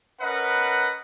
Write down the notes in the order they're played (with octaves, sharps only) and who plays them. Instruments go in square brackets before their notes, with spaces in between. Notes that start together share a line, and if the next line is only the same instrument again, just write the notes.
[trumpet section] C#4 A#4 B4 D#5 F#5